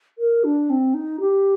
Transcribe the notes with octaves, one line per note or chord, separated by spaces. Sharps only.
A#4
D4
C4
D#4
G4